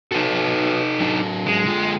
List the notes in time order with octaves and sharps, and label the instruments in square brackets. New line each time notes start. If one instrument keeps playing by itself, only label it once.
[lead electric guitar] D#4 A4 [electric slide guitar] F#4 B4 C#5
[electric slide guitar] F#3 D4
[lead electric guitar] G#3
[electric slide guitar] D3 F4